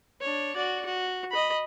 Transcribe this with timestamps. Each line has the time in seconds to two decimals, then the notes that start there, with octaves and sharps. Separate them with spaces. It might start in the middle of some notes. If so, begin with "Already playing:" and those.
0.21 D4 C#5
0.56 F#4 D5
0.85 F#4
1.31 D#5 B5